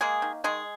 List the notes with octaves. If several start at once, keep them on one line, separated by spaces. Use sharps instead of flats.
G#3 A#3 G#4
D#3
D#3 G#3 G#4